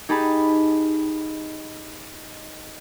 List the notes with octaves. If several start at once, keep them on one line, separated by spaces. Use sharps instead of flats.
D#4 G4 G#4 A5 B5